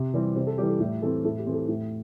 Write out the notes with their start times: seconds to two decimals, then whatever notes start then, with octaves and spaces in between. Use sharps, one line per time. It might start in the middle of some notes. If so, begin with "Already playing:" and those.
Already playing: C3
0.14 E3 G3 C4
0.35 C3 C5
0.47 A4
0.58 E3 G3 G4
0.69 A4
0.80 A2 G4
1.02 E3 A3 C4 A4
1.25 A2 A4
1.39 G4
1.46 E3 A3 C4
1.54 A4
1.68 A2